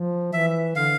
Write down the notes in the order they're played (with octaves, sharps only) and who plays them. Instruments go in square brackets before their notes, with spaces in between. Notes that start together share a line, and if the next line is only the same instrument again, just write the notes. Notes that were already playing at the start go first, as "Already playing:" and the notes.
Already playing: [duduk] F3
[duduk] E3 [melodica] E5
[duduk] D3 [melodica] F5